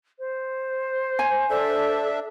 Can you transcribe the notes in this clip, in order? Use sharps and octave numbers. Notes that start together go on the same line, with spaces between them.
C5
G#5
D4 A4 E5